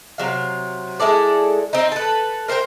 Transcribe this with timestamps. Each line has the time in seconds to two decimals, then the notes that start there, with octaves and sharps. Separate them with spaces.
0.18 C3 F#3 F5
1.00 G#3 E4 A4 D5
1.73 C4 D#4
1.92 A4 B4
2.48 A#4 C5 F#5 G5